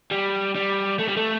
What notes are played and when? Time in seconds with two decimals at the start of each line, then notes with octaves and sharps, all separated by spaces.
0.11 G3
0.55 G3
0.99 A3
1.09 G3
1.17 A3